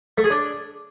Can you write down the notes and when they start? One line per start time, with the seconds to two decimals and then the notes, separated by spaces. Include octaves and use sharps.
0.18 A3
0.24 G#4
0.30 D4